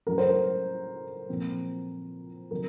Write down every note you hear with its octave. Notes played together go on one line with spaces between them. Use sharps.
A2 F#3 A3 C#4 A#4
C5
A#4
A#2 F3 C4
C3 D#3 F#3 A#4